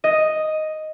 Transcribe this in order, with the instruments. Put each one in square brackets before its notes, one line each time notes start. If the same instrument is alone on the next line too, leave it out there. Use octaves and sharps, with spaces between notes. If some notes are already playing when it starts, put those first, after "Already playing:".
[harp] D#5